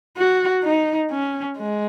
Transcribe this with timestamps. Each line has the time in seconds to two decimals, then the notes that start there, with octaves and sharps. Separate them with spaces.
0.18 F#4
0.64 D#4
1.11 C#4
1.58 G#3